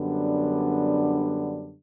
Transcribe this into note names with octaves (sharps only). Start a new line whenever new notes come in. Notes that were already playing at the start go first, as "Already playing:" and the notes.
Already playing: F#2 D3 G3 B3 D4